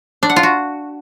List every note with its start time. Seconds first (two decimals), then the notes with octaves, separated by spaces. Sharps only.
0.23 D4
0.30 F#5
0.36 F4
0.43 F#4